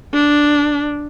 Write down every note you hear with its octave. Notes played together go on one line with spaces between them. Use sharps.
D4